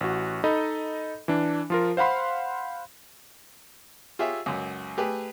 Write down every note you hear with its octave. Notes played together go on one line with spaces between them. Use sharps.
A1 F#4
D#4 A4 D#5 B5
E3 D4
F3 F4 A#4
C5 F5 F#5 B5 C6
F4 G4 G#4 C#5 E5 E6
C#2 F#2
A3 G4 G#4 B4